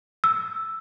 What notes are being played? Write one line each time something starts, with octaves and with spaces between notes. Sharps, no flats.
E6